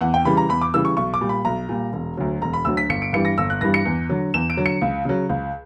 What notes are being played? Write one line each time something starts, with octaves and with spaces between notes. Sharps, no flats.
E2 F#5
G5
C#3 E3 G3 B5
A#5
E2 B5
D6
C#3 E3 G3 E6
C#6
B1 C#6
D6
A#2 G3
B5
B1 A#5
A#2 G3
E1
D2 D3 F#3
E1 A#5
B5
D2 D3 F#3 E6
B6
G1 C#7
D7
G2 E3 G3 C#7
A#6
G1 E6
F#6
G2 E3 G3 A#6
C#7
E2
D3 F#3
E2 E7
D7
D3 F#3
C#7
C#2
C#3 F#3
C#2